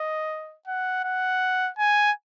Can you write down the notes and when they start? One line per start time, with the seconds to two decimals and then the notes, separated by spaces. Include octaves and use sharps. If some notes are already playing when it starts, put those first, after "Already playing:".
Already playing: D#5
0.68 F#5
1.04 F#5
1.78 G#5